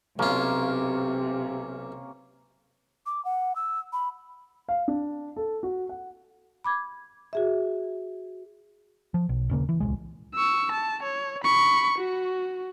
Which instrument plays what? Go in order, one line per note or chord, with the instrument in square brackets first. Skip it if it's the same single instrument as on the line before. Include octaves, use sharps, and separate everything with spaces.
[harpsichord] B1 F4 [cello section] C3 [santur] A#3 C#4
[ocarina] D6
F#5
E6
B5
[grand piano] F5
D4
A4
F#4
F#5
[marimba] B5 D6 G#6
F#4 G#4 E5
[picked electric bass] F3
B1
D#1 C#3 A#3
E3
D1 C2 G#3
[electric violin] C#6 E6
A5
C#5
B5 C#6
F#4